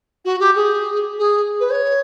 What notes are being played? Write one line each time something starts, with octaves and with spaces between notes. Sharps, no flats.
F#4
G4
G#4
G#4
B4
C#5